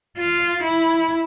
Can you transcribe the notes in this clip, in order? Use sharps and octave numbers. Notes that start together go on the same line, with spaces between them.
F4
E4